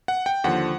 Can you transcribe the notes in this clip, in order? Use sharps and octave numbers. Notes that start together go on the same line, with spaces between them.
F#5
G5
D#2 D3 F3 F#5